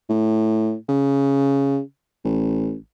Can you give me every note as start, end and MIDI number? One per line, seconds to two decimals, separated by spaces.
0.09 0.75 45
0.89 1.80 49
2.25 2.75 33